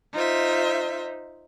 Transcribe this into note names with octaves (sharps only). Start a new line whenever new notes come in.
D#4 F4 C5 E5